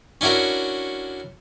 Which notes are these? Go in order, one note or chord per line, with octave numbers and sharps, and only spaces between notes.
C#4 D4 E4 F#4 A#4